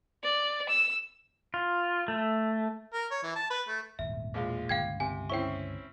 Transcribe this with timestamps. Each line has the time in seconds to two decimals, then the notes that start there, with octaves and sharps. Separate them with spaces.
0.23 D5
0.68 E6
1.54 F4
2.08 A3
2.94 A#4
3.11 C#5
3.24 E3
3.36 A5
3.50 B4
3.68 A3
3.99 D#1 G#1 E2 E5
4.34 A#1 E2 B2 G#3 F4
4.69 G1 C#2 F5 G5 G#6
5.00 C3 G#5
5.30 C4 C#4 E4 G5 C#6